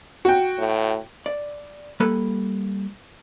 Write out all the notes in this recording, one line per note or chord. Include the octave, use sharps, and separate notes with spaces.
F#4 G5
A2
D5
G3 A#3 A4 B4 B5